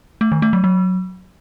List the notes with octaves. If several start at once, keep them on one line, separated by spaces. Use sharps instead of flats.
A3
D#3
A3
F#3
F#3